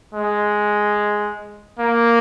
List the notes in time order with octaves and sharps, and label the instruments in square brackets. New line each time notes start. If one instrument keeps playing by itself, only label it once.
[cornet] G#3
A#3